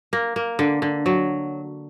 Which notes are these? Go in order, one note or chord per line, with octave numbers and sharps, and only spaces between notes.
A#3
A#3
D3
D3
F#3